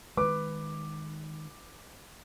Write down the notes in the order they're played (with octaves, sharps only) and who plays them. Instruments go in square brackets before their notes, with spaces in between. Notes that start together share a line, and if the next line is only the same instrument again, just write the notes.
[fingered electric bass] D#3 G#3 [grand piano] B4 D6